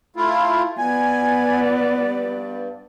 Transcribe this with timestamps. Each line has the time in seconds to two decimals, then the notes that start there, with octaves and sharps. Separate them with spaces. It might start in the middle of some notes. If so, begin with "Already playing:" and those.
0.16 A3 E4 F4
0.78 B3 D5 G#5
1.92 G2